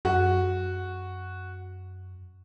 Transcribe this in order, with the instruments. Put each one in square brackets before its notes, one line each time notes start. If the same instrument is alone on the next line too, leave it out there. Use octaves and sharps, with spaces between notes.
[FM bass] F#2 [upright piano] F#4